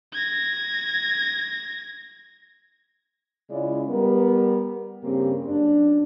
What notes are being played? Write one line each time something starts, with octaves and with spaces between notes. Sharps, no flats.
G#6 A#6
C#3 G#3 C#4 E4 F4 D5
G3 B3 A#4
G2 C#3 A#3 C4 G4
F#2 D4